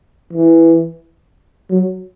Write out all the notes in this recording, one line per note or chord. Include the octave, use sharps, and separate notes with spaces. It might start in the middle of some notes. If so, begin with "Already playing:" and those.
E3
F#3